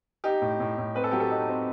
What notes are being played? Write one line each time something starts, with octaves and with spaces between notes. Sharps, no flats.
D#4 G4
A2
A2
A2
C4 B4
A4
F#3 G4
A4
D#4
C4